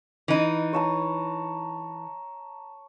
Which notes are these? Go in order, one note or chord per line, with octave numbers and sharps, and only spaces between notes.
E3 D#4
C#5 A5 A#5